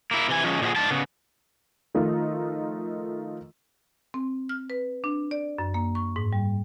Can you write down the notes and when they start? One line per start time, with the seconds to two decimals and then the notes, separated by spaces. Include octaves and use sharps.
0.11 A#3 E4
0.29 C3 E3 G#5
0.44 F3 G#3 C#4
0.61 A#2 F3 F#3 E4 F#4 G#4
0.76 G#2 D4 F4 A5
0.91 C#3 B3
1.94 D#3 F3 A3 D#4 F4
4.14 C4
4.49 F6
4.70 B4
5.04 D4
5.31 D5
5.58 F#2
5.74 A#3
5.95 C#6
6.16 G#2
6.33 G3